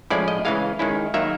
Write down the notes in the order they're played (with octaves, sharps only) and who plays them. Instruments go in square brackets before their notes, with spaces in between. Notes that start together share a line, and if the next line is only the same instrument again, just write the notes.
[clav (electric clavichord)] A2 F3 G#3 C#4 E4 D5
D#5
C#3 E3 G#3 F5
D#3 G#3 C#4 E4
D#3 F#3 A#3 E5